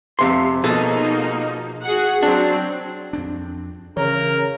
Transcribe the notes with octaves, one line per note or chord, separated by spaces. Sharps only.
F2 C3 C6
B2 F3 A#3 D#4 G#4 A4
F#4 G#4 F#5
F#3 C4 D4
F2 C4 D4
C#3 E3 A#4 C#5